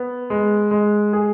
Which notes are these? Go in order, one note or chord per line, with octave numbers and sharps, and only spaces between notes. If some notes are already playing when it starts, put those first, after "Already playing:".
Already playing: B3
G#3
G#3
G#4